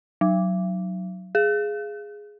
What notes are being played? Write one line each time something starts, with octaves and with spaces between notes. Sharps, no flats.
F#3
G#4